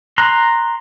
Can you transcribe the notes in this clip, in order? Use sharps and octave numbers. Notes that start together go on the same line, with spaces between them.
A#5 C6 F#6